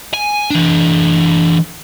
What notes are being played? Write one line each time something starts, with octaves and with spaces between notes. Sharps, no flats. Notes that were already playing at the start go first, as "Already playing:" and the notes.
G#5
E3 D4